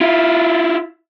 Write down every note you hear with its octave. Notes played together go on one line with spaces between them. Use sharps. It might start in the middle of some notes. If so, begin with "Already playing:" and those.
E4 F4